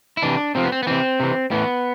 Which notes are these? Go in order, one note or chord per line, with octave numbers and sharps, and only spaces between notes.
E4
C3 E3 D4
C3 F3 C4
B3
C4
B3
C3 E3 C4
C3 E3
A2 E3 B3